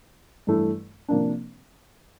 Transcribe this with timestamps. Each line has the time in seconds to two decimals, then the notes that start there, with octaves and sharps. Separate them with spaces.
0.47 G2 E3 A3 E4
1.08 C3 F3 A#3 D4